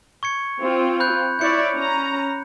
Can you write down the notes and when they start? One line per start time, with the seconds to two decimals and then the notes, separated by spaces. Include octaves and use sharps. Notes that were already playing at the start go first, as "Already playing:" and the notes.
0.23 C#6 G#6 C#7
0.60 C4 F4
1.00 B5 F#6 G6
1.39 E4 C#5 D5 G6 C#7
1.75 C#4 A#5